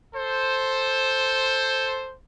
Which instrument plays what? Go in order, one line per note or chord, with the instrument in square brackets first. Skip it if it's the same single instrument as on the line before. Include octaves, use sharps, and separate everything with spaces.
[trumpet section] A4 C5